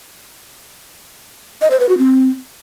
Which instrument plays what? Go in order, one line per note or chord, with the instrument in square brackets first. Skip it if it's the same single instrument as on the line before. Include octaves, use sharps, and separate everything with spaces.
[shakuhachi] D#5
C5
B4
F#4
C4